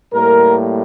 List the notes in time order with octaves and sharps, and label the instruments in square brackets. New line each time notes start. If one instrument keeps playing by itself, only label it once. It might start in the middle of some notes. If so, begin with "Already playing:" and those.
[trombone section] A2 G3 A#3 A#4